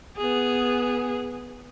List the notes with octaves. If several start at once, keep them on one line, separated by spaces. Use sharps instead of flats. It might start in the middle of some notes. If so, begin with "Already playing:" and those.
B3 G#4